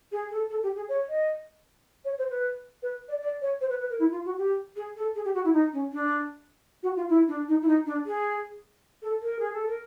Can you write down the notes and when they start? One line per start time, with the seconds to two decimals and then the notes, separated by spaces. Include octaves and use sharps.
0.12 G#4
0.31 A4
0.50 A4
0.63 G4
0.76 G#4
0.89 C#5
1.09 D#5
2.05 C#5
2.18 C5
2.30 B4
2.83 B4
3.08 D5
3.21 D5
3.41 C#5
3.61 C5
3.70 B4
3.80 B4
3.90 A#4
3.99 E4
4.12 F4
4.25 F#4
4.38 G4
4.76 G#4
4.96 A4
5.15 G#4
5.25 G4
5.34 F#4
5.45 E4
5.53 D#4
5.73 C#4
5.92 D4
6.83 F#4
6.96 F4
7.09 E4
7.28 D4
7.48 D#4
7.62 E4
7.68 D#4
7.86 D4
8.06 G#4
9.02 A4
9.22 A#4
9.39 G#4
9.53 A4
9.67 A#4